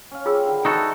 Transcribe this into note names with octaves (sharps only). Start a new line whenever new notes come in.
C#4 F5
F4 G4 G#4 C5 E6
D3 D#3 E4
E3 D#4 F#4 A4